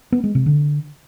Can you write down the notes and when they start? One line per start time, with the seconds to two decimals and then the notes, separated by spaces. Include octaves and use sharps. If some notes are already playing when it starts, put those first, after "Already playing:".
0.12 B3
0.24 G#3
0.35 C3
0.46 D3